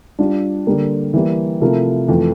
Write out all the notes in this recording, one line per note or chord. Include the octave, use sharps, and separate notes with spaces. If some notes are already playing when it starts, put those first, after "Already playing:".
G3 D4 F4
D3 G3 A#3
E3 G3 A#3
C3 F3 A3 E4 A#4
F2 E3 A3